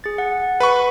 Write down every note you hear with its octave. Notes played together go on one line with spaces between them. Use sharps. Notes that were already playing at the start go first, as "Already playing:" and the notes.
G#4 A6
F#5
B4 B5 C#6